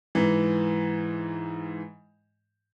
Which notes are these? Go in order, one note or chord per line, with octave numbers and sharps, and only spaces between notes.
G#2 E3